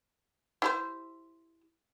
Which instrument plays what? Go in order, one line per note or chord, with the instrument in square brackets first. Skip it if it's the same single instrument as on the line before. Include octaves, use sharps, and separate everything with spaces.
[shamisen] E4 G4 C5